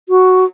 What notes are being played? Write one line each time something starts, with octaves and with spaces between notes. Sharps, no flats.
F#4